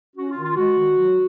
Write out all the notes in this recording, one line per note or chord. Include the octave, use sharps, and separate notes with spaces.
C#4 F#4
F4
D#3
F4
G#3 F#4
D#3
F#3